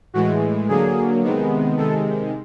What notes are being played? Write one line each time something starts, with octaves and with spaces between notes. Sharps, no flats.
A2 E3 G#3 F#4
D3 F#3 A#3 G#4
C3 D#3 G#3 B3
C3 D#3 G#3 A4